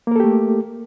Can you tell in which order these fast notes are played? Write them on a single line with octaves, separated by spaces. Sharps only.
A#3 A#4 A4 G4 A3